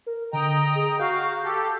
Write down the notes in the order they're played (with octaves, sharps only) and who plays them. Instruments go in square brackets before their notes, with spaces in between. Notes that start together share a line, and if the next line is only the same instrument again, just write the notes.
[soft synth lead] A#4
[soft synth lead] D3 [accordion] D#5 G5 A#5
[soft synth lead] G#4
[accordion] F#4 F5 [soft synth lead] G6
[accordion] G4 A4